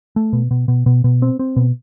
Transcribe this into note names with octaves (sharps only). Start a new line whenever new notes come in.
A3
B2
B2
B2
B2
B2
C4
C4
B2